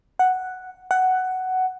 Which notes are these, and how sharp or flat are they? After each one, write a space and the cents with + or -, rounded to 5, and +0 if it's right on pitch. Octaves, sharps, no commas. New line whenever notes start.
F#5 +0
F#5 +10